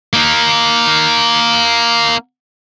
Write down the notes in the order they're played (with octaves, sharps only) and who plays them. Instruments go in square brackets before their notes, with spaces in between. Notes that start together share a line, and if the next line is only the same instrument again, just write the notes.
[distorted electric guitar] A#3 D#4